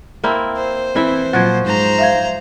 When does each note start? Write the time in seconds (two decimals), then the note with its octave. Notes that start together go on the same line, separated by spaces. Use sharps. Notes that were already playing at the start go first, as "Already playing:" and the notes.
0.24 A#3 C4 E4
0.57 C5
0.95 E3 C4 E4 E5
1.33 A#2 F3 F#3 F#4 G#6
1.65 G#2 C5 A#5
1.99 E5 F5 G#6